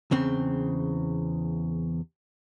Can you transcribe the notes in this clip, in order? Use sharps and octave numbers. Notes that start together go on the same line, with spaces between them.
E2 C#3 C4